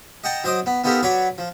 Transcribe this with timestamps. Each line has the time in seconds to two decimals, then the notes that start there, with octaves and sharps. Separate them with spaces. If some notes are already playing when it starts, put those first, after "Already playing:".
0.24 D#5 F#5 G5 A5 A#5
0.44 F#3 C5 D#5 D6 D#6
0.66 B3
0.84 B3 D#4 F4 G4 A4 A#4
1.03 F#3 F#4 B4 C#5 D5
1.38 F3